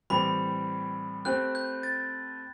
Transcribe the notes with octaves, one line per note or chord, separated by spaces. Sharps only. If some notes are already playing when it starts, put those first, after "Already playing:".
A2 E3 G3 C4 G4 B5
A3 C4 G4 C5 F#6
G6
A6